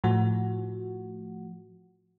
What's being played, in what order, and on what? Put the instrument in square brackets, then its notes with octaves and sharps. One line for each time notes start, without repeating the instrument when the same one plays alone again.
[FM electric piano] A2 F3 F#4